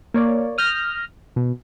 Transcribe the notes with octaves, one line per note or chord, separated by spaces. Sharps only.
A#3 C#5 D5
D#6 F6 G6 A#6
B2